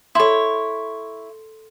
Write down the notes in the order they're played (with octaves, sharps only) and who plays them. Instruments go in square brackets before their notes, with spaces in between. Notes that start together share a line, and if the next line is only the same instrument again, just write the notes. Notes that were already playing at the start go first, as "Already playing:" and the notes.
[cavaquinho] E4 C#5 [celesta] A4 C6